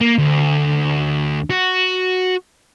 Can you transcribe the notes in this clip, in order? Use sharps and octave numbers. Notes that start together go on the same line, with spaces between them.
A#3
D2
F#4